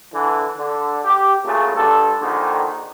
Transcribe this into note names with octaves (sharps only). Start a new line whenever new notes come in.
D3 E3
D3
G4
A#2 C#3 F#3 A3
G2 D3 A4
A#1 D3 D#3